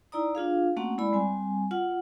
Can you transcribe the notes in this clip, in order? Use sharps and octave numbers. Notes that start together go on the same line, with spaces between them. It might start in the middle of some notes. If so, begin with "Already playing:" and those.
D#4 E4 D5 A#5 D#6
D4 F4 G#4 F5
A3 A#3 C4 C#4 F#4 F#5
G#3 E4 D5 B5
G3 C4 G#5
F4 F#5